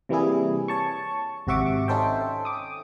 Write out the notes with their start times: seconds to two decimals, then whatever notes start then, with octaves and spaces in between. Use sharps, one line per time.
0.09 C3 E3 G3 A#3 E4 G#4
0.68 C#5 A5 C#6
1.47 G#1 C3 F#4 E5 C#6 D6
1.88 C#4 D#4 A4 C5 E5 G5
2.45 D6 D#6